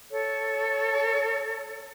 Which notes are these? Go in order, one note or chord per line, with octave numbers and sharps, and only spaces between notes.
A4 C#5